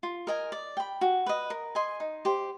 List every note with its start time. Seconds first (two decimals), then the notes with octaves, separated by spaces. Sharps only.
0.03 F4
0.27 A#4 D#5 G#5
0.52 D5
0.77 G5 B5
1.01 F#4
1.26 B4 D#5
1.50 A#4
1.75 D#5 G#5 C6
2.00 D#4
2.25 G4 C5